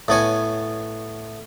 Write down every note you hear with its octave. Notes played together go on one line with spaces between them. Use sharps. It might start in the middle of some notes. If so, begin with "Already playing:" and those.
A2 B3 C#5 G#5